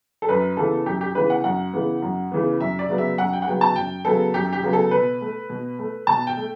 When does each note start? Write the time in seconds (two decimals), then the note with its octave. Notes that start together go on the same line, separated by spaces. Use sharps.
0.22 A4
0.29 F#2 B4
0.57 C#3 E3 B3 A4
0.86 F#2 G4
1.01 G4
1.15 C#3 E3 B3 B4
1.30 F#5
1.44 F#2 F#5
1.73 C#3 E3 B3
2.02 F#2
2.32 C#3 E3 B3
2.60 F#2 E5
2.79 D5
2.89 C#3 F#3 B3
2.98 E5
3.18 F#2 F#5
3.33 G5
3.42 F#5
3.47 C#3 F#3 B3 G5
3.61 A5
3.76 F#2 G5
4.05 C#3 F#3 B3 A4
4.34 F#2 G4
4.53 G4
4.63 C#3 F#3 B3
4.73 A4
4.91 B2 B4
5.21 A3
5.49 B2
5.79 A3
6.07 B2 A5
6.27 G5
6.37 A3